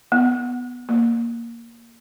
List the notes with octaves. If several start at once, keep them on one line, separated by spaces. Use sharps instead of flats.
B3
A#3